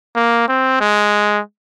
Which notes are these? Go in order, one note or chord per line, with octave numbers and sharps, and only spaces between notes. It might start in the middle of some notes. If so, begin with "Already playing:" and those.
A#3
C4
G#3